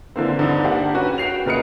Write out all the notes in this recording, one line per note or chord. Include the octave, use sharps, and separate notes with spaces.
D3 E3 A#3 C4
G2 D3 C4 D#4
A#3 D4 G4 F#5
C#4 F#4 B4
F#4 G5 C7 F7
A#2 C#3 A#4 B4 D#5 C#7